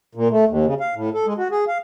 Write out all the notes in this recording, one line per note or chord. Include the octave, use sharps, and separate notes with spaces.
A#2
A3
D#2
C#3
F5
A2
A4
G#3
F#4
G#4
F5